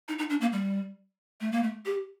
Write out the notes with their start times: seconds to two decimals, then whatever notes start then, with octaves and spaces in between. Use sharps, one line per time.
0.09 D#4
0.19 D#4
0.30 D4
0.41 A#3
0.52 G3
1.41 A3
1.52 A#3
1.63 A3
1.85 G4